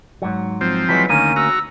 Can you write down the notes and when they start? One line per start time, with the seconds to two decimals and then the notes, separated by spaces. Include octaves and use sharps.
0.22 G#2 F#3
0.61 F3 C4
0.89 E3 F#3 G#3 B6
1.09 D2 D#3 A#3 C#4 D#7
1.36 F#4 A#5 E6